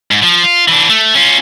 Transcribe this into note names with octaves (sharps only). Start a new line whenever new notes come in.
G#2
F3
F4
E3 D4
A3
C#4 F4